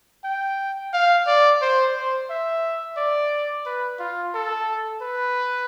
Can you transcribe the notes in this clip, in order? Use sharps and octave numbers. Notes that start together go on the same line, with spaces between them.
G5
F5
D5
C5
C5
E5
D5
B4
F4
A4
B4